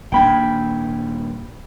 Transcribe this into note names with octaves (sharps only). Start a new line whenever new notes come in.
D#1 A#3 D4 G5 B5 G#6